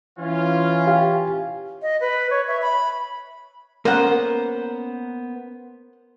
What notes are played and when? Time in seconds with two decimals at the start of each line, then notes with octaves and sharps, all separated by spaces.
0.19 E3 C#4 F4
0.87 G4 F5 G#5
1.82 D#5
2.01 B4
2.30 C#5
2.48 E5
2.62 B5
3.85 A#3 B3 C#4 A#4 C5 F#5